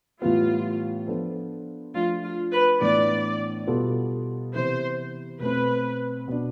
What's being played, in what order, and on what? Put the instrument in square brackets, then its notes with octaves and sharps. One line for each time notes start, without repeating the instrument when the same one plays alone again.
[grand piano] A2 E3 G3 B3 [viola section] F4
[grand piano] F3 B3 D4 A4 C5
[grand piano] F3 A3 D4 [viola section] F4
[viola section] F4
B4
[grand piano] A2 E3 B3 D4 [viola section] D5
[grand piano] B2 G3 B3 F4 A4
[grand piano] C3 E3 B3 E4 [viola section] C5
[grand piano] B2 A3 C4 [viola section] B4
[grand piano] B2 B3 D4